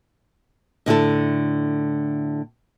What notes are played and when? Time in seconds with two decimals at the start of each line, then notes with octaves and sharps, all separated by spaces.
0.86 A2 D3 E4 A4